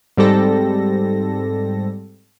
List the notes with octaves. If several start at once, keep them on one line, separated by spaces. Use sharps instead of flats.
G#2 G3 C4 G4 A4 A#6